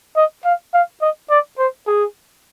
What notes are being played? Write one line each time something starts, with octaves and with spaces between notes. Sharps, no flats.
D#5
F5
F5
D#5
D5
C5
G#4